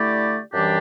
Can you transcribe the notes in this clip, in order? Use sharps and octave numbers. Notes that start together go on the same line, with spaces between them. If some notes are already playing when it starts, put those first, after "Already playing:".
Already playing: D3 A3 E4 G4 D5
F#2 E3 G3 D4 G4